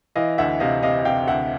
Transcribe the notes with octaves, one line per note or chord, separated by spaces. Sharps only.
E3 D#5 F5
D2 E5 F#5
C3 D#5 F5
C3 D#5 F5
C3 F5 G5
D2 E5 F#5